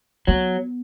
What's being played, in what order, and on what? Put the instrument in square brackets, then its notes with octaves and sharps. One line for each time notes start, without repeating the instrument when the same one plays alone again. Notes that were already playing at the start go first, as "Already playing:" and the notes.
[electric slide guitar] F#3 [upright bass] B3